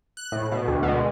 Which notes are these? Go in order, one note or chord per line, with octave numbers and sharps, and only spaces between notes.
F#6
A2
B2
D2
B2
G#3